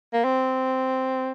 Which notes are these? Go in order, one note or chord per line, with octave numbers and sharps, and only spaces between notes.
A#3
C4